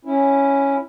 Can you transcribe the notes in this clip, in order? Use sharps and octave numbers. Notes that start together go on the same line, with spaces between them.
C#4 E4